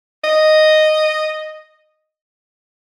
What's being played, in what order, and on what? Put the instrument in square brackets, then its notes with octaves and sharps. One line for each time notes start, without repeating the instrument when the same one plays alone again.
[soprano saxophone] D#5